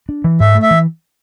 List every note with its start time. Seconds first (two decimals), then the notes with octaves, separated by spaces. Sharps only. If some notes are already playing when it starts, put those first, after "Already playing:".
0.09 D4
0.24 E3
0.40 G#2 E5
0.55 A3
0.62 E5
0.71 E3